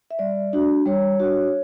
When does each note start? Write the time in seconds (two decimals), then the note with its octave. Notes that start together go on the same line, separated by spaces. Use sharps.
0.11 E5
0.19 G3 D5
0.53 D4 F#4
0.86 G3 C#5
1.19 D4 F#4